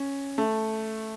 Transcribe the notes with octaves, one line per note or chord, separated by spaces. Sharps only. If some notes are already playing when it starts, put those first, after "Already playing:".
Already playing: C#4
A3